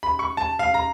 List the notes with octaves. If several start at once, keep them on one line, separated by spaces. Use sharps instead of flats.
B5
C#6
A5
F5
A#5